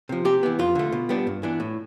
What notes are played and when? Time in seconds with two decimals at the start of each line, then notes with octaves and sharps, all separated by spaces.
0.09 C3 F3
0.25 C3 G4
0.43 E3 B3
0.59 F2 F4
0.75 D3 A3
0.92 B2
1.09 G3 B3 D4
1.27 G2
1.43 E3 B3 D4
1.60 A2